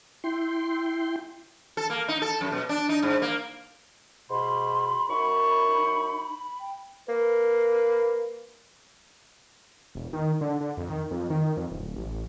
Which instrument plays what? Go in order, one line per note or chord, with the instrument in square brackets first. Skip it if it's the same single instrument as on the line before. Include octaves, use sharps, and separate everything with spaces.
[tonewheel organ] E4 G5 C6
[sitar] A4
A#3
D#4
A4
F#2
B2
D4
D#4
G#2
A#3
[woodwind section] G#2 B2 [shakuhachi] B5 [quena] C6
[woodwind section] F#2 C#6 [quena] D#4
[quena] G5
[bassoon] A#3 [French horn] B4
[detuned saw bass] E1
D#3
D3
D3
F2
D#3
F2
D#3
F2
D1
A1